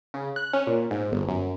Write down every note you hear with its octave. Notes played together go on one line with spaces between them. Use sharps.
C#3
F#6
C#4
A#2
G#2
G1
F#2